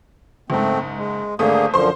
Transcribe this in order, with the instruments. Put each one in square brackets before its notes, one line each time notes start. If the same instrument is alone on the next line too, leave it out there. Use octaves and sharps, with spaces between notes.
[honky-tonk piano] F#1 G#2 [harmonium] A3 C4
[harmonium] G#3
[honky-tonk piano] G#1 A3 D#6 [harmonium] D3 A#3 G#4
[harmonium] F#2 D3 F3 [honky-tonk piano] C5 C6